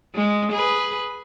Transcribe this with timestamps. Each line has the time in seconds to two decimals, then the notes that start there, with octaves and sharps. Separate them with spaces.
0.15 G#3
0.52 G#4 B4